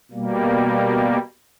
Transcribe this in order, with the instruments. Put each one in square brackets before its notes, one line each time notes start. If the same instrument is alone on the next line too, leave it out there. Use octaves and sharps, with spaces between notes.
[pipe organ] B2 G3 A#3